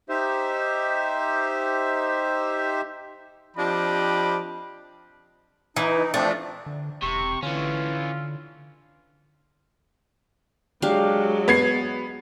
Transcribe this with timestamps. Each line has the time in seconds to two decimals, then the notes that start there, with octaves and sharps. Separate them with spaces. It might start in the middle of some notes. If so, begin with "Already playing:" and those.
0.09 D#4 G4 C5 E5
3.57 F3 C4 D4 G4 D#5 B5
5.76 E3 D#4
6.14 F3 A3 C4 D4
6.66 D3
7.03 E1 C3 C#6
7.43 D3 E3 C#4 F4
10.82 F#3 G#3 D4 G4 F5
11.48 B3 G#6 C7